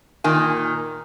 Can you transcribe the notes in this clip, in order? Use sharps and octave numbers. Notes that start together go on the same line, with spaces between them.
A#2 D#3 G#5